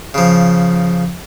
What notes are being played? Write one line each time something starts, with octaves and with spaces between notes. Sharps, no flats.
C#3 F3